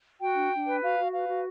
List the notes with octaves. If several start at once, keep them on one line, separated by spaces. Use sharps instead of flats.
F#4 G5
D4
D4
B4
F#4 F5
F#4
B4 F5
F#4